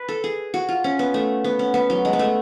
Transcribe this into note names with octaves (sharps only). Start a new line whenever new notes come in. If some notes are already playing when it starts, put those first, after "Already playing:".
Already playing: B4
A4
G#4
F#4
F4
C#4
B3
A3
B3
C#4
B3
F#3
G#3
B3
A3